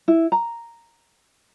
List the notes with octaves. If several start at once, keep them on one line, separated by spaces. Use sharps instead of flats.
E4
A#5